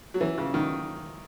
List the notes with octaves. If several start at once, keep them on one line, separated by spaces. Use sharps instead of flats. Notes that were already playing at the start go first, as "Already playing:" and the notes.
F#3
E3
C#3
D#3